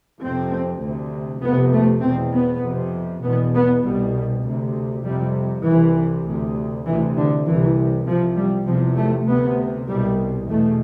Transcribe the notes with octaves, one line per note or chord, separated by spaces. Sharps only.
F2 C3 C4
D2 C3
F2 C3 B3
A3
E2 B2 C4
B3
F2 C3
E2 B2 B3
B3
C2 B2 G3
D2 C3
F2 C3 G3
C2 C3 E3
D2 C3
D2 C3 E3
D3
C2 E3
C3
C2 C3 F3
G3
E2 C3 F3
A3
D2 C3 B3
C2 B2 G3
E2 B2 A3